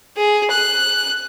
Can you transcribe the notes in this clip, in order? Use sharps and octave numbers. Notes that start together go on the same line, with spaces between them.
G#4
F#6